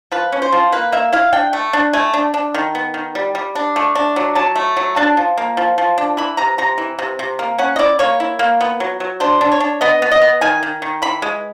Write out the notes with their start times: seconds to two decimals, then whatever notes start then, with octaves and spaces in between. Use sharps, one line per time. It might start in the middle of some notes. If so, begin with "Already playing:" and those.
0.12 F3 B4
0.32 C#4
0.42 C5
0.52 F3
0.72 A#3 B4
0.92 A#3 E5
1.13 E4 F5
1.33 D4 G5
1.53 A3
1.73 D4
1.93 A3 G#5
2.14 D4
2.34 D4
2.54 D#3
2.75 B3
2.94 D#3
3.15 G3
3.35 G3
3.55 D4
3.76 A3
3.95 D4
4.16 F#3
4.35 F#3 A5
4.56 A3
4.77 F#3
4.96 D4 A5
5.17 F3
5.38 A#3
5.57 F3
5.78 F3
5.98 D4
6.17 E3 B5
6.37 C3 A#5
6.58 C3 A#5
6.78 E3
6.99 C3
7.19 C3
7.39 A#3
7.58 C#4 F#5
7.76 D#5
7.79 E4 D5
7.99 A#3 C#5
8.20 E4
8.39 A#3
8.61 B3
8.80 F#3
9.00 F#3
9.20 D4 C5
9.41 D4
9.52 C#5
9.60 D4
9.81 B3 D#5
10.02 B3
10.11 D#5
10.21 B3
10.41 D#3 G#5
10.63 D#3
10.82 D#3
11.02 E3 B5
11.22 G#3